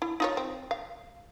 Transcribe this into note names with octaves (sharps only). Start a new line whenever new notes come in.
E4
D#4 F4 C#5
C4
F5